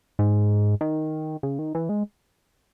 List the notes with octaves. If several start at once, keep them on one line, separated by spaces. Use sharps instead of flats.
G#2
D#3
C#3
D#3
E3
G#3